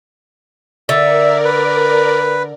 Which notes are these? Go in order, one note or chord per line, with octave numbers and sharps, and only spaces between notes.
D3 A#4 D5 E5
B4